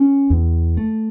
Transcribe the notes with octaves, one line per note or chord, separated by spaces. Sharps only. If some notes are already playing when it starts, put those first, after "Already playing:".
Already playing: C#4
E2
A3